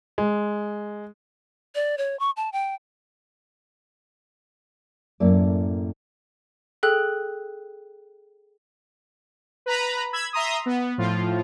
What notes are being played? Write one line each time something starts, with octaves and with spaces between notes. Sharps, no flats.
G#3
D5
C#5
C#6
A5
G5
F#2 A2 A#3 E4 D5
G#4 A4 G5 F#6
B4 A#5 B5
B5 E6 G#6
E5 A#5 C6 D#6
B3
A2 F3 F4